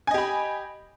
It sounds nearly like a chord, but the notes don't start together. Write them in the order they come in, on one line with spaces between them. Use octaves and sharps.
G#5 D#5 G4 B5